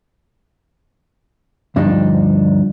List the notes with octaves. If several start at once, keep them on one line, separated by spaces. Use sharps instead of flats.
D2 G2 F3 D4 D#4